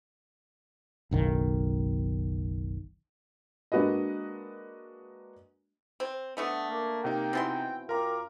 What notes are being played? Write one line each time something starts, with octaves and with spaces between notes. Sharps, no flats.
F#1 B1 D#3
G#3 A#3 D4 F#4 B4 D#5
C4
D3 A3 B3 F#5 D#6
A#3
C3 D#4 G5
B2 E3 C4 C6
F#2 F4 A#4 G5 A#5 D6